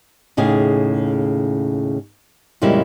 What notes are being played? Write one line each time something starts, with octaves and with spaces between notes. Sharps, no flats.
D#2 A2 C#3 G#4
F2 A#2 C#3 G3 G#3 E4